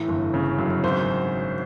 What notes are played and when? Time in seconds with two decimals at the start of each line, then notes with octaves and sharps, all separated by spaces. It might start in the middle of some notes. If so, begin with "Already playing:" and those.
Already playing: A2 E3
0.08 G1
0.34 C#3
0.59 F#2
0.84 G#1 C5